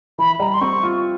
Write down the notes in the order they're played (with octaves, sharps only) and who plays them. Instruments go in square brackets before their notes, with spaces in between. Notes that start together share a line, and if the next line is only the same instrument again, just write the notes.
[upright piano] E3 [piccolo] B5
[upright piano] G3 [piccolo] A#5
[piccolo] B5
C6
[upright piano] C4 [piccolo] C#6
[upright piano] F4